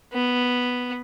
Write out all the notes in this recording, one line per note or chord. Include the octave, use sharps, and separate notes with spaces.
B3